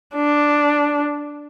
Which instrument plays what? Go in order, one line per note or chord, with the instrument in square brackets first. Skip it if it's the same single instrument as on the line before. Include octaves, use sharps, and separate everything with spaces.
[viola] D4